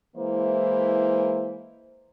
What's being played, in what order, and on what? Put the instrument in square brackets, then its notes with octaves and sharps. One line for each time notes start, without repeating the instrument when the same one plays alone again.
[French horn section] E3 G#3 A#3 E4 C5